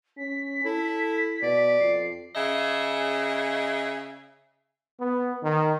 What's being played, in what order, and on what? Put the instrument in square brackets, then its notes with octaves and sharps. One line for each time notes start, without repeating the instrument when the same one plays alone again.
[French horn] C#4 [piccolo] B6
[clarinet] E4 [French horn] A4
[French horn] B2 [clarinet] D5
[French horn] F2 [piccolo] C7
[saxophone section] C#3 D#5 E5
[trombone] B3
D#3